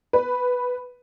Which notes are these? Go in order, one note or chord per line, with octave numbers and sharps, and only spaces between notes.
B4